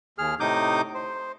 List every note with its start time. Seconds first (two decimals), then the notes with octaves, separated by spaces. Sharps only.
0.18 D#2 G#4 F6
0.40 A2 C3 D#4 D6 D#6 G6
0.94 C5